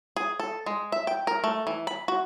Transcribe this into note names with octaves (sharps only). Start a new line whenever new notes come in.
G#4
A4
G#3
E5
G5
A#4
A3
E3
B5
F#4